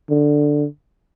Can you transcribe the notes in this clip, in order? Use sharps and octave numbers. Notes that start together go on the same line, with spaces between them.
D3